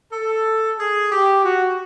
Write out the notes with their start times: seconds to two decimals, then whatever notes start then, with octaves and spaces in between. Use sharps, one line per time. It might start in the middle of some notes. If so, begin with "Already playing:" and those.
0.12 A4
0.78 G#4
1.12 G4
1.45 F#4